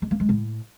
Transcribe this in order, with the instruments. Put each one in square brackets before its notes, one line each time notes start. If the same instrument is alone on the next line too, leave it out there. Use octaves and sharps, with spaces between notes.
[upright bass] G#3
A#3
G#3
A2